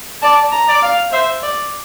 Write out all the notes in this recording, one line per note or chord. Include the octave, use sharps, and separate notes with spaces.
D5 A5
A#5
D5
F5
C5 E5
D5